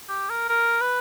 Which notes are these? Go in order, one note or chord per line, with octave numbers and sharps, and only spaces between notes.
G4
A#4
A#4
B4